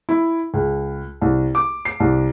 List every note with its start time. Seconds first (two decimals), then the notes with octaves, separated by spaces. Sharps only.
0.09 E4
0.54 C#2
1.21 C2
1.55 D6
1.85 C7
2.00 C2